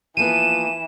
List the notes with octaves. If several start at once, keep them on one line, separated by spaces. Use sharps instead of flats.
E3 F3 A#3 B3 D#7 E7